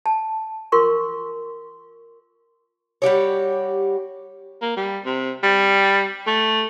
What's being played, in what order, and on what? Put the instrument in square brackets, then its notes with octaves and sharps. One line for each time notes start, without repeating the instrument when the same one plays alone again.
[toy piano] A5
F4 A#4 C6 C#6
[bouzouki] G3 F#4 G4 C#5
[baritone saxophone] A#3
G3
C3
G3
A3